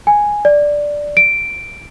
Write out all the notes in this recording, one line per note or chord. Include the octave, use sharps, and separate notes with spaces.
G#5
D5
D7